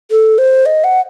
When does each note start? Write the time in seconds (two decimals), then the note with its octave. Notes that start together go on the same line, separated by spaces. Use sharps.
0.11 A4
0.38 C5
0.66 D#5
0.84 F#5